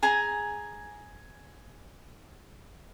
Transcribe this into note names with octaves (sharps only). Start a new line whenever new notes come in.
G#4 G#5 A#5